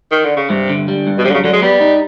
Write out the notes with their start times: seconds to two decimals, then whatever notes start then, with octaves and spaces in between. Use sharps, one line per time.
0.12 D#3
0.25 D3
0.37 C#3
0.50 G2 C3
0.69 D3
0.88 G3
1.07 G2
1.18 B2
1.25 C3 F#3
1.30 D3
1.34 C#3
1.44 D3 F#3
1.53 G#3
1.62 G3 B3
1.81 D#4